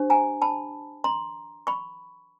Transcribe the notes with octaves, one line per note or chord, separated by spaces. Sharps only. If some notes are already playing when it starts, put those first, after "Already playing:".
Already playing: D4 G4 C5
G#5 A#5
A5 B5
A#5 C6
B5 C#6